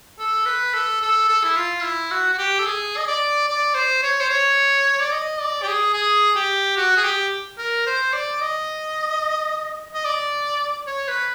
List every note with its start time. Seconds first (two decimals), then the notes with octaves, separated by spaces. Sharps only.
0.19 A4
0.46 B4
0.74 A4
1.01 A4
1.29 A4
1.44 E4
1.56 F4
1.83 E4
2.11 F#4
2.33 F#4
2.38 G4
2.59 A4
2.66 G#4
2.97 D#5
3.07 D5
3.48 D5
3.75 C5
4.03 C#5
4.20 C5
4.29 C#5
5.00 D5
5.12 D#5
5.40 D5
5.63 G4
5.67 G#4
5.94 G#4
6.35 G4
6.76 F#4
6.97 G#4
7.04 G4
7.58 A#4
7.86 C5
8.13 D5
8.41 D#5
9.94 D#5
10.04 D5
10.87 C#5
11.08 B4